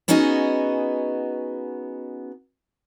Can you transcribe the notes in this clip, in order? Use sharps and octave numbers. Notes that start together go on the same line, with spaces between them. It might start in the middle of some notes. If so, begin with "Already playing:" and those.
B3 C#4 D#4 F#4 G#4 D#5